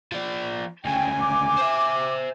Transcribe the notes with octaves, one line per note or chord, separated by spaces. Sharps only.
F3 D5
D2 C#3 G5 G#5
D6
C5 E5